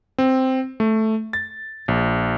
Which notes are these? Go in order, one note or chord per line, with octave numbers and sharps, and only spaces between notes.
C4
A3
A6
A#1